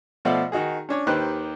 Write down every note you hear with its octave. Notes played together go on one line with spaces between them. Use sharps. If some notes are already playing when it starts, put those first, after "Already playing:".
B2 F3 A3 D5 E5 F#5
D#3 D#4 F#4 G#4
C#4 D4 C#5
D#2 D#3 G4 B4 C5 F#6